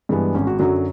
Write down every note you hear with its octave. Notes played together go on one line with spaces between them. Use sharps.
G2 E3 G#3 B3
G#1 C#4
F#4
F#2 D3 F#3 F#4